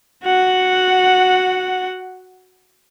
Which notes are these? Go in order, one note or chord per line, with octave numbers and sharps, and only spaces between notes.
F#4 F#5